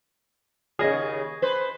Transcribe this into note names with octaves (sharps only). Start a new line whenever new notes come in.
D#2 C#3 G#4 D#5
B4 C5